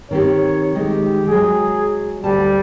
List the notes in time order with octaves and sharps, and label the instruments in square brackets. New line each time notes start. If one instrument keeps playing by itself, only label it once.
[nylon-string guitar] D#3 C4 G4 [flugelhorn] C#5
[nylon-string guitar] D#3 G#3 A3 [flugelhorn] G4
[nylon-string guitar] F#3 G#3 [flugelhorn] G#4
[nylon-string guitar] D2 A5 [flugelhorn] G3